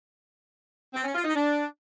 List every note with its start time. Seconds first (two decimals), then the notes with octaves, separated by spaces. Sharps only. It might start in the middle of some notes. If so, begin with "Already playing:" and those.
0.93 C4
1.04 C#4
1.14 F4
1.24 D#4
1.35 D4